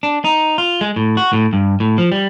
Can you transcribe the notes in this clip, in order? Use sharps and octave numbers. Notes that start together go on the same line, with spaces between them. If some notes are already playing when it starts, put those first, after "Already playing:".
D4
D#4
F4
G#3
A2
F#4
A2
G2
A2
F3
G3